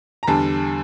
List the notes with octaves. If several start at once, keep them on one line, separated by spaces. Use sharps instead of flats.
A#5
E2 D3 G3 A5